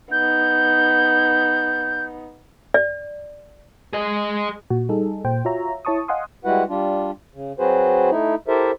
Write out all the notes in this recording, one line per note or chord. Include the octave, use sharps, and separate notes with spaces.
B3 D#4 G6
D5
G#4 D#5
A#2 F#4
G3 D#4 G#4 A4
A#2 C5 G5
F4 F#4 C#5 E5 A#5
E4 C#5 A5 C#6 D#6
D#5 F5 F#5 G#5 C6 D#6
G3 G#3 E4 F#4 B4 F#5
G3 D4 F4
C#3
F#3 C4 F#4 G#4 B4 C5
A3 D#4 E4
E4 G4 A4 A#4 C5 E5